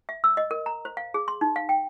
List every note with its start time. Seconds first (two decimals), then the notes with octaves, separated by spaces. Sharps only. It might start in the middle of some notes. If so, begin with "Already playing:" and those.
0.09 E5
0.24 E6
0.37 D#5
0.51 A#4
0.66 A#5
0.85 C5
0.97 F5
1.14 G#4
1.28 C6
1.41 D#4
1.56 F5
1.69 G5